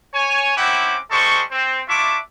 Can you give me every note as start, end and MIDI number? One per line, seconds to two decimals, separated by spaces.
0.14 0.56 73
0.14 0.56 80
0.57 0.96 60
0.57 0.96 61
0.57 0.96 64
0.57 0.96 78
0.57 0.96 79
0.57 0.96 86
1.11 1.42 55
1.11 1.42 56
1.11 1.42 69
1.11 1.42 72
1.11 1.42 85
1.51 1.80 60
1.88 2.17 62
1.88 2.17 64
1.88 2.17 65
1.88 2.17 76
1.88 2.17 85
1.88 2.17 86